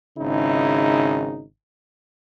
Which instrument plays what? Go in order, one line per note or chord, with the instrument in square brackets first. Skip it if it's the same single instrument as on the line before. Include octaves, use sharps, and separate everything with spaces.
[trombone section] G#1 C#3 D#4 E4